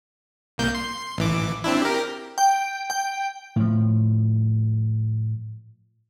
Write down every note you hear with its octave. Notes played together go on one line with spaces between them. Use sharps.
C2 A#3 G6
C6
A1 E3 D6
C4 D4 E4
G4 A#4
G5
G5
A2 F3